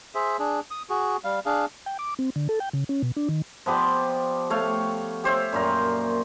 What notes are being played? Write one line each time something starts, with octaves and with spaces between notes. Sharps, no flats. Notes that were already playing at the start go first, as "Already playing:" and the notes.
G#4 C5 E5
D4 G#4
D#6
F#4 G#4
G3 F5
D4 G#4 F5
G5
D6
C4
D3
A4
G5
C#3
C#4
B2
D4
D#3
F3 B3 G4 D5
A3 C#5 F5
G4 C5 C#5 E5
F#2 A#2 A#4